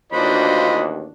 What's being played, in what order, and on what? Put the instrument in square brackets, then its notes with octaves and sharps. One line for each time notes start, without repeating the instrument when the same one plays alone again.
[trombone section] A1 D#2 [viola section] D4 F#4 [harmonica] F4 C5 D#5 [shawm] B5